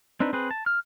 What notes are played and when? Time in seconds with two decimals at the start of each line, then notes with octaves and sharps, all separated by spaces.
0.20 C4 D4 D#4 B4
0.33 C4 G#4 B4
0.51 A5
0.66 F6